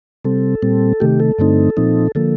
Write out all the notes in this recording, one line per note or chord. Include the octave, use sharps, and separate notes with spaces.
C3 G3 C4 A4
A#2 G3 C4
C3 D#3 A3 G4
A4
G2 D3 A3 C4 D#4
A#2 F3 C4 D#4
D3 F3 A#3 A4